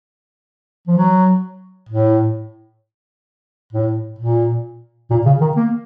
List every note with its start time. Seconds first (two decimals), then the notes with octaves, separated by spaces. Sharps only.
0.88 F3
0.97 F#3
1.89 A2
3.73 A2
4.19 A#2
5.10 A#2
5.26 C#3
5.41 D#3
5.57 A#3